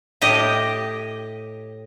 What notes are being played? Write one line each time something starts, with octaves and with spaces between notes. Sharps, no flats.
A2 G4 D#5